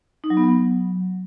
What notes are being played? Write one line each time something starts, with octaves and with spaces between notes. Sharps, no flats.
D#4
F#3
B3
F#3